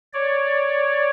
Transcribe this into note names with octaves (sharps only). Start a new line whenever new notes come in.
C#5 D5